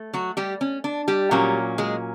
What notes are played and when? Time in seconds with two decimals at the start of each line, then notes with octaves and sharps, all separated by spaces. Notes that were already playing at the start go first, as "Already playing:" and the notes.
Already playing: A3
0.13 F#3 F#4
0.37 G3 G4
0.61 C#4
0.84 D4
1.08 G3 G4
1.31 A#2 F#3 A#3 C#4
1.78 G#3 G#4